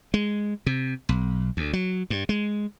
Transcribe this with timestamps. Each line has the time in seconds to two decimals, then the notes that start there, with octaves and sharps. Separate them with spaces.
0.14 G#3
0.66 C3
1.09 B1
1.57 D2
1.73 F#3
2.10 G2
2.29 G#3